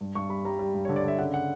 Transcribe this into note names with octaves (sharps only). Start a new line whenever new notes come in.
G2
G2 C#6
G3 B5
G3 A#5
G3
G2
D3 C#5
D5
D3 E5
C#3 F#5
F#5